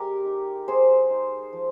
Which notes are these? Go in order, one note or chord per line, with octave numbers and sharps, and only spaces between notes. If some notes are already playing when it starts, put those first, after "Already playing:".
Already playing: G#3 G4 A#4
D#4
G#3 G#4 C5
D#4
F3